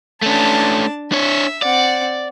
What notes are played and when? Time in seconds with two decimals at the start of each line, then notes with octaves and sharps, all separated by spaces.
0.22 A3 C#4 D4 A5
1.12 D4 C#5 E5
1.62 C4 D5 F#5